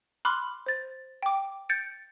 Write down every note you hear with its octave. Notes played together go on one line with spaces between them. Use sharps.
B5 C6 D6 F6 F#6
C5 A6
G5 D6
G6 A6 C#7 D7